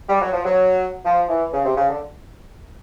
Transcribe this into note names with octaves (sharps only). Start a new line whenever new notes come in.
G3
F#3
F3
F#3
F3
E3
C#3
C3
C#3
D3